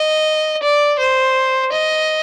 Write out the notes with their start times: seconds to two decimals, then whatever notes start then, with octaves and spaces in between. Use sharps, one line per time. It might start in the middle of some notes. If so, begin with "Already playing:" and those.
Already playing: D#5
0.62 D5
0.99 C5
1.72 D#5